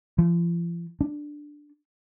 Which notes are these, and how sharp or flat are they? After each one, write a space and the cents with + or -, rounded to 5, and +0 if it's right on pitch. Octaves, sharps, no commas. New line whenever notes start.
F3 -40
D4 +5